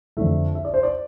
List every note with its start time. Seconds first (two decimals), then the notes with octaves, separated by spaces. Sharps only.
0.17 F2 D3 A3 E5
0.55 E5
0.65 D5
0.74 C5
0.83 D5